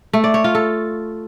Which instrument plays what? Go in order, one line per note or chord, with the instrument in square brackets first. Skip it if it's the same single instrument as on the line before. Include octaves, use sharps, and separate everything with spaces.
[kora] A3
D5
C#5
F4
A4